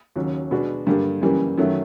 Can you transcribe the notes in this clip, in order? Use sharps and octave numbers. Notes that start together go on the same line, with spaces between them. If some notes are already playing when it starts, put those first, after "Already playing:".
D#2 C#3 F#3
B2 G#3 B3 D4 F#4
G2 D3 G3 A#3
F#2 C#3 E3 G3 A#3
F#2 D#3 F#3 A3